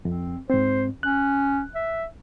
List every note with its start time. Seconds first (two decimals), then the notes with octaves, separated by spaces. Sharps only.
0.05 F2 C4
0.50 G#2 C4 C5
1.03 C#4 F#6
1.75 E5